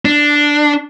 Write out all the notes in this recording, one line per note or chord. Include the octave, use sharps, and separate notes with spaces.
D4